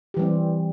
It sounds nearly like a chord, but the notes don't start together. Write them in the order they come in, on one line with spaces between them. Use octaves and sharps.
G4 E3 G3 C4